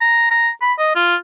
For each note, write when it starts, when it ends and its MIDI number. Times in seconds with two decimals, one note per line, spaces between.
0.01 0.30 82
0.31 0.49 82
0.62 0.73 83
0.79 0.92 75
0.95 1.16 65